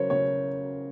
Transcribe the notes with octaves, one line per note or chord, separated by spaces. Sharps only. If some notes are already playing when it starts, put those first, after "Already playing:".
Already playing: C#3 F#3 A#4 C5 C#5
C#3 C#5